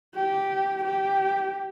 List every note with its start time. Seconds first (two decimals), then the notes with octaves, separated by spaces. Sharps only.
0.15 G4
0.84 G4